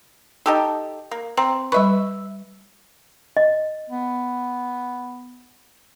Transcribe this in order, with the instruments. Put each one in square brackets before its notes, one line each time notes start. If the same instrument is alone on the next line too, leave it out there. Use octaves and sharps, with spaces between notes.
[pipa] D#4 G4 A4
A#3
[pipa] C4 [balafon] A#5
[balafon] G3 C#6 [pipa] B4 E5
[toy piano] D#5
[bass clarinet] B3